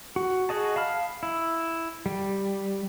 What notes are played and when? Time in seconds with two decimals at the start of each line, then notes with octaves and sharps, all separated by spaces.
0.16 F#4
0.49 F#4 G#4 D#5 A5
0.76 F5 A5 B5 F6
1.23 E4
2.06 G3